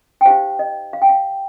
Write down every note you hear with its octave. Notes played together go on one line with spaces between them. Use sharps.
G5
D#4 G4 C5 F5
D#5
F5
G5
F5